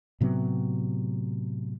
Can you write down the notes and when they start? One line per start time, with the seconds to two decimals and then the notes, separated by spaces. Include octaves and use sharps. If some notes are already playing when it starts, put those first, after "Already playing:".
0.21 A2 C3 F#3 B3